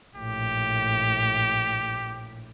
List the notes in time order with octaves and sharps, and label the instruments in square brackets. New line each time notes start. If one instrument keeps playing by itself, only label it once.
[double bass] A#1 A2 [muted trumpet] G4